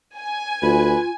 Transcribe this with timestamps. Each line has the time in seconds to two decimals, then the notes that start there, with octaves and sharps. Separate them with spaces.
0.19 G#5
0.62 D2 F4 B4